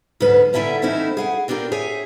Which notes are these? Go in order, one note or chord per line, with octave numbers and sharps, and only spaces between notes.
D2 G#2 F#3 C#4 G#4 B4
D3 G3 E4 E5 G#5 A#5
E3 A3 C4 C#4 D#4 E4
G#4 F5 F#5
C4 D4 F4 G4 A#4
G#4 C#5 E5 G#5